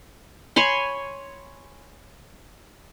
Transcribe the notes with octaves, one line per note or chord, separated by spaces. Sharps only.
C#5 G#5 B5 C6